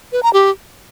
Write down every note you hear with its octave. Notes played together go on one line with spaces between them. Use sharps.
B4
A#5
G4